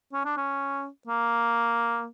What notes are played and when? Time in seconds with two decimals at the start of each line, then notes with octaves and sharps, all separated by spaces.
0.13 C#4
0.25 D4
0.37 C#4
1.07 A#3